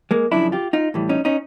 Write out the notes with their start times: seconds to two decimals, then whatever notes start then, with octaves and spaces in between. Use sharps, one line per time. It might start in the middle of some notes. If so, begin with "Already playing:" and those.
0.11 G#3 A#3
0.32 F#2 C#3 F3 D4 E4
0.52 F4 G4
0.73 D#4 F4
0.94 A2 E3 G3
1.09 C#4 D#4
1.25 C#4 D#4